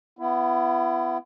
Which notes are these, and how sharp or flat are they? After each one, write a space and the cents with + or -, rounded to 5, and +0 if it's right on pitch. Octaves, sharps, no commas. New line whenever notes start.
B3 +10 E4 +35